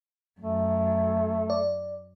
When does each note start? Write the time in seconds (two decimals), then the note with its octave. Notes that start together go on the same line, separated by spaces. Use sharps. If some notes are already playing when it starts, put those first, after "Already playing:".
0.40 F#2 A3
1.50 D5